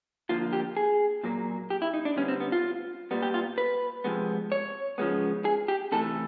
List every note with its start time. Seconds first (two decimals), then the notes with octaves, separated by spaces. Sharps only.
0.29 D3 F3 A#3 F4
0.53 G4
0.77 G#4
1.23 A#2 F#3 A#3
1.70 G4
1.82 E4
1.94 D#4
2.05 D4
2.16 D3 G3 B3 C#4
2.28 C4
2.40 B3
2.52 F4
3.11 A#2 G3 B3
3.22 G4
3.34 F4
3.58 B4
4.04 C3 F3 G#3 B3
4.52 C#5
4.98 C#3 F3 G#3 B3
5.45 G#4
5.68 G4
5.92 C3 E3 A3 A4